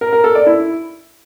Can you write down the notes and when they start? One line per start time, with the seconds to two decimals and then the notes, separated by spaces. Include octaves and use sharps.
0.01 A#4
0.13 A#4
0.24 A4
0.35 D5
0.47 E4